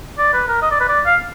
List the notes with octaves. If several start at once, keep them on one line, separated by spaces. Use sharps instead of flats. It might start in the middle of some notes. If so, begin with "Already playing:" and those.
D5
B4
A#4
D#5
D5
B4
D5
F5